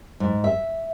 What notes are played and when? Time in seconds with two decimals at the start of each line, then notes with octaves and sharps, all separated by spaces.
0.20 G#2
0.44 E5